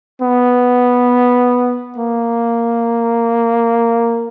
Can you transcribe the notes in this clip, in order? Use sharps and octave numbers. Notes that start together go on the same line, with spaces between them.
B3
A#3